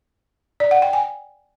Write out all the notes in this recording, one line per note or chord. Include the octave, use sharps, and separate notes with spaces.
D5
F#5
G5
G#5